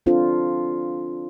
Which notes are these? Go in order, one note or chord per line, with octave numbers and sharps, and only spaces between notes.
C4 D4 F4 A4 C5